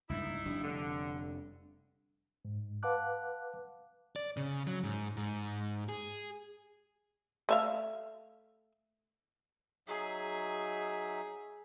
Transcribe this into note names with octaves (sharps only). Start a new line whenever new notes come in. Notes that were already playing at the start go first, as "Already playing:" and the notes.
C#2 G2 A#2 D#4 E4
F1 G3 D4
D3
G#2
B4 F5 F#5 A5 D6 F#6
D5
C#3
F#3
G#2
G#2
G#4
A3 E5 F5
F#3 D#4 G#4 E5